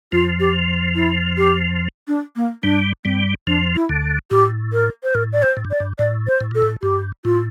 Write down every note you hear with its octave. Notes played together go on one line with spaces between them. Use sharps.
F2 F3 F4
G4
E4
G4
D4
A#3
G2 G3 D4
G2 G3 C4
F2 F3 D4
E4
D2 D3
A2 G4
A#4
C5
A2 A#4
D5
C5
A2
G2
D5
G2
A2 D5
C5
A2
A#2 A4
A2
G2 G4
A2 F4